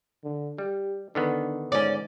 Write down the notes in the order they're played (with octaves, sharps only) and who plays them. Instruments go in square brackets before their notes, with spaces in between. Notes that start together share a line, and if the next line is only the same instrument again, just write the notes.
[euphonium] D3
[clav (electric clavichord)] G3 [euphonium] G4
[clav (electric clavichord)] D3 D#3 B3 [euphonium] D4
[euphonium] G#2 [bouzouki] C#4 D5